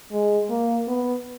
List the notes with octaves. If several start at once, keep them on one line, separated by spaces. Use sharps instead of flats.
G#3
A#3
B3